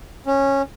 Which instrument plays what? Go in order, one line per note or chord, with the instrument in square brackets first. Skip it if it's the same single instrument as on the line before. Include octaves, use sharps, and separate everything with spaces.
[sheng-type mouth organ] C#4